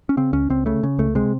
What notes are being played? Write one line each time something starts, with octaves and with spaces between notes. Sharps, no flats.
C#4
C#3 C4
C#2 C#4
C#2 C4
C#3 A3
C#3
C#2 A3
C3 G#3